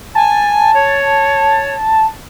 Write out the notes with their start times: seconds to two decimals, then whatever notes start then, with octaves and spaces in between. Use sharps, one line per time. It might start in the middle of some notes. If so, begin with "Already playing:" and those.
0.15 G#5 A5
0.74 C#5